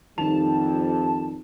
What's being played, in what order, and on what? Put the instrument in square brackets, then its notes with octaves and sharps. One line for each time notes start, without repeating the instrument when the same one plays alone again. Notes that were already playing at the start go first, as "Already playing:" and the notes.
[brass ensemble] F2 G3 [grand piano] D#3 F7 [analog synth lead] A5